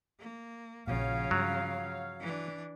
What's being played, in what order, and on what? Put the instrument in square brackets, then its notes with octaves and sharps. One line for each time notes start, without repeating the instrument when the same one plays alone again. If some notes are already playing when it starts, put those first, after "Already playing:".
[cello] A#3
[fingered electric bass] A#1 A#2 [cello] C#3 F3 [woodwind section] F#4 C#5 F5
[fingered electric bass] G2 [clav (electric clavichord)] F#3
[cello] E3 D4